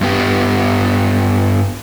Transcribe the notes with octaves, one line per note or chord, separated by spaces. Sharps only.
G2 B3 G4